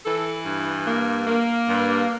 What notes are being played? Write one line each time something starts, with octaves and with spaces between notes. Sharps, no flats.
E3 A4
G2
A#3
A#3
G2